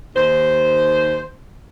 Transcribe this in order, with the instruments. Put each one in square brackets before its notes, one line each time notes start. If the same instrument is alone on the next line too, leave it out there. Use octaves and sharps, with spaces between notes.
[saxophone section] D#2 C5